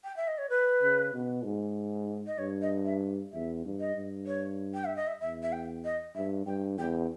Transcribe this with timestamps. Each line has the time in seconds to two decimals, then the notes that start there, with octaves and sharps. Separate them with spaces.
0.04 G5
0.16 E5
0.27 D#5
0.38 C#5
0.50 B4
0.82 C#3
1.13 B2
1.44 G#2
2.27 D#5
2.38 G2 C#5
2.62 D#5
2.85 E5
3.33 E2 E5
3.65 G2
3.80 D#5
3.95 G2
4.27 C#5
4.74 G5
4.85 E5
4.96 D#5
5.07 E5
5.21 E2 E5
5.42 E5
5.52 G5
5.84 D#5
6.15 G2 E5
6.46 G2 G5
6.78 E2 G5